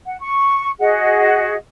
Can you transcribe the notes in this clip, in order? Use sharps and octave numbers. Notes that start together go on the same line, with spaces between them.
F#5
C#6
F#4 G#4 D#5 F#5